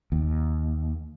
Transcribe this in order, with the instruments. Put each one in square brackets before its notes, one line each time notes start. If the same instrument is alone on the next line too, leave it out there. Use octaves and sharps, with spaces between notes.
[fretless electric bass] D#2